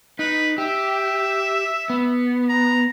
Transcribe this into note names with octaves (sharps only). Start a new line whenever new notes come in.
D#4 B4
G4 E5
B3
A#5